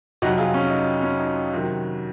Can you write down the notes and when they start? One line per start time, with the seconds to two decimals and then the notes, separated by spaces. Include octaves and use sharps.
0.22 F2 C3 F#3 D#4 F#4
0.38 F4 G#4
0.54 C#4
0.70 D#4
1.03 C#4
1.19 D#4
1.53 C3 D#3 F#3